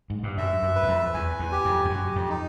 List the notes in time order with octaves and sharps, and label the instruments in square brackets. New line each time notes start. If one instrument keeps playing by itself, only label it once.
[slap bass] G#2
G2
[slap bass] F#2 [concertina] E5
[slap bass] F#2
[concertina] B4
[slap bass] E2
F2
[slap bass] E2 [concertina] G#5
[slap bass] E2
[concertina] G4
[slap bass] F2
F2
[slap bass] F#2 [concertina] G4
[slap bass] F2
[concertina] D#4